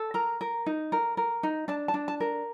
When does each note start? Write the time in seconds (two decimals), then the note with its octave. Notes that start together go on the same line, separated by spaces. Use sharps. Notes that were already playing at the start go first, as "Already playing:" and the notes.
Already playing: A4
0.14 A#4 A#5
0.41 A#4
0.66 D#4
0.92 A#4
1.17 A#4
1.43 D#4
1.68 D4 A5
1.88 A5
1.94 D4
2.08 A5
2.20 A#4